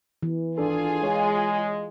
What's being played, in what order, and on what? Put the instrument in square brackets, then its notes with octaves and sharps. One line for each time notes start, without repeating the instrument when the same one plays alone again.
[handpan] E3
[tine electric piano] G#1 D4 A4 [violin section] F4 G#4 G#5
[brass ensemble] G#3 [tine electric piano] C#5